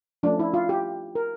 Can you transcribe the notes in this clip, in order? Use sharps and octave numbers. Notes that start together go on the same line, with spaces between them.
F3 A3 C#4 D4
E4
F4
G4
A#4